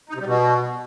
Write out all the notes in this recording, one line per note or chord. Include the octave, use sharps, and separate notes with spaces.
D#4
C3
G3
B2